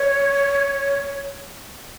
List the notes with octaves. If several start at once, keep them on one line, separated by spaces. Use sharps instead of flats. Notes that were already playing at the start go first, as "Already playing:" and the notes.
Already playing: C#5